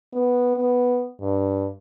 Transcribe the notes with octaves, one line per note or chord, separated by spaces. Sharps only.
B3
B3
G2